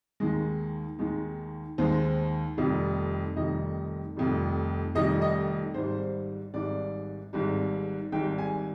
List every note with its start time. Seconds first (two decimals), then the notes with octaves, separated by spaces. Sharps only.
0.20 D#2 D#3 G#3
0.99 D#2 D#3 G#3
1.78 D#2 D#3 G#3 C5
2.57 F1 F2 D#3 G3
3.36 F1 F2 D#3 G3 D#5
4.16 F1 F2 D#3 G3
4.95 F1 F2 D#3 G3 D#5
5.22 D#5
5.74 G#1 G#2 G3 C5
6.54 G#1 G#2 G3 D5
7.33 G#1 G#2 G3
8.12 G#1 G#2 G3 G5
8.38 G#5